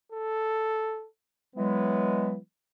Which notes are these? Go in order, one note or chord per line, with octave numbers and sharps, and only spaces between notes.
A4
E3 F#3 G#3 B3